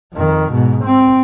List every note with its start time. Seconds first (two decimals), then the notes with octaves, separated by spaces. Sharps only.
0.13 F2 D#3
0.52 G#2 B2
0.85 C4